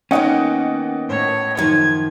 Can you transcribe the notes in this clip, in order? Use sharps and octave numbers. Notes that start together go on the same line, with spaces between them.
D#3 A#3 B3 C#4 D#5 F#5 G5
A2 C#5
F#2 D#3 F3 G#6